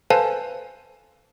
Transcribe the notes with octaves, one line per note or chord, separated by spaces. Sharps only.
A4 B4 C5 F5 G#5 A5